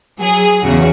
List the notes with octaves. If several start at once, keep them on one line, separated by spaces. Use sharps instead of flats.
F#3 G#4
E2 C#3 F#4